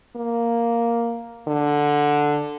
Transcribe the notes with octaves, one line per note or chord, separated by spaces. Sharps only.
A#3
D3